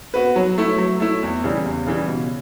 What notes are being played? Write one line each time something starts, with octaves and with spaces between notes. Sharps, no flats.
B3 F#4 B4
F#3
A3 E4
F#3
A3 E4
E2
C#3 E3 G3
E2
C#3 E3 G3
B2